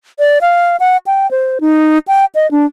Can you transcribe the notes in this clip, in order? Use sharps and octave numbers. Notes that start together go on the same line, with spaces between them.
D5
F5
F#5
G5
C5
D#4
G5
D#5
D4